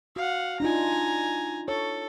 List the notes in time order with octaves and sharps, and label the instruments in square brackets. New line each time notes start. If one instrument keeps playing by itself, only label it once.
[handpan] F#4 [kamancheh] F5 F#5
[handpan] D4 D#4 F4 [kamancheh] G#5 A#5
[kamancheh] A4 [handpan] C#5